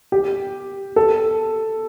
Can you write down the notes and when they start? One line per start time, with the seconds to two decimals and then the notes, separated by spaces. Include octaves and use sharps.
0.12 G4
0.96 A4